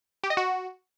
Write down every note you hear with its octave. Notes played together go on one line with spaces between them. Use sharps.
G4
D#5
F#4